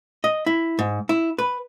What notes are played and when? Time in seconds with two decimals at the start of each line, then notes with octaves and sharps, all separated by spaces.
0.24 D#5
0.46 E4
0.79 G#2
1.09 E4
1.38 B4